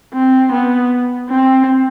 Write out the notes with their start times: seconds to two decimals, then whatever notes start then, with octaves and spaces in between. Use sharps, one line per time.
0.14 C4
0.52 B3
1.30 C4